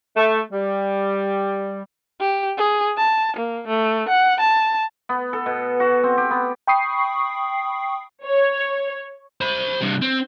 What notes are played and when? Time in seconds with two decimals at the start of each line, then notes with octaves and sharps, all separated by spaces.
0.17 A3
0.52 G3
2.21 G4
2.58 G#4
2.97 A5
3.36 A#3
3.67 A3
4.08 F#5
4.40 A5
5.09 B3
5.33 A4
5.46 B2
5.80 F#4
6.03 C4
6.17 G4
6.31 B3
6.67 G5 B5 C#6 D#6 C7
8.25 C#5
9.41 C5 B5
9.80 G2 C3
10.01 C4